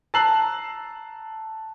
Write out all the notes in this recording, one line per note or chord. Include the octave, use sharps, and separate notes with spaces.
A5 A#5 E6 F#6 C7 F#7